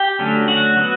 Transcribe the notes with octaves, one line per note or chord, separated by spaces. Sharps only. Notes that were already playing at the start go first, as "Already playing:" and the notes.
Already playing: G4 G5
D3 F#3 A3 C#4
F#4 F#5
F#3 B3